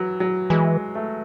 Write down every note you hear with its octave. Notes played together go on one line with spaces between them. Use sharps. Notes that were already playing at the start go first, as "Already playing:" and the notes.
Already playing: E3 F#3
F#3
E3 G#3
A3